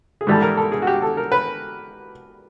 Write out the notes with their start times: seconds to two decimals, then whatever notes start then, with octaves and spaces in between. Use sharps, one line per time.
0.21 G#4
0.27 G#2 E3 G3 A4
0.42 A#4
0.57 A4
0.72 G#4
0.82 F#4
0.87 G4
1.02 A4
1.17 A#4
1.32 B4